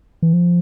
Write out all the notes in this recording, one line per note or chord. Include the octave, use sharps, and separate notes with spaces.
E3
F3